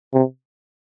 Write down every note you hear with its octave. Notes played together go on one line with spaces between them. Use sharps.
C3